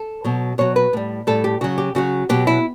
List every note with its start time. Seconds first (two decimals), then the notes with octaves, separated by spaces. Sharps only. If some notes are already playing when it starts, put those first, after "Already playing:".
Already playing: A4
0.24 B2 F#3
0.58 B2 F#3 C#5
0.76 B4
0.93 A2 G3
1.27 A2 G3 A4
1.44 G4
1.61 C#3 F#3 F#4
1.78 G4
1.95 C#3 F#3 F#4
2.29 B2 F#3 G4
2.47 E4